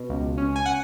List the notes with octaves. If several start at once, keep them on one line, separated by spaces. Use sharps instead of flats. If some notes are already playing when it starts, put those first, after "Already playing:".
Already playing: B2
C#2
C#4
G#5
F#5